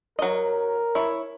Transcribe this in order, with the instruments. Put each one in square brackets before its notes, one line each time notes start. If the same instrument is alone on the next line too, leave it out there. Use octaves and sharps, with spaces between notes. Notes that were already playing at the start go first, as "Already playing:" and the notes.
[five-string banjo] F#3 D#5 [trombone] A#4
[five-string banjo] E4 C#5